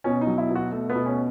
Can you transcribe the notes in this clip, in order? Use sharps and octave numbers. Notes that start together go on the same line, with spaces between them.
B2 C#4
D#4
F#3
E4
B2
F#4
A3
B3
B2
C#4